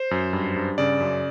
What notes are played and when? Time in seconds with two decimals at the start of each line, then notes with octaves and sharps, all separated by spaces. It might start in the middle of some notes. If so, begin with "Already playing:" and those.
Already playing: C5
0.11 F#2
0.33 G2
0.56 G2
0.78 C#3 D5
1.00 F#2